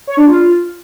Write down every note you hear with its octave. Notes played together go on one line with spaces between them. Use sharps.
C#5
D4
F4